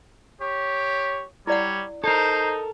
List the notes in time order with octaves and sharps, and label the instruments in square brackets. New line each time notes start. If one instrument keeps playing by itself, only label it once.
[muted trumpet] G4 [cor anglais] C#5
[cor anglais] G3 [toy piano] E4 D5 F#5 [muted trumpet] C#5
[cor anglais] D#4 [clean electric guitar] A4 A#4 [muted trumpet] C5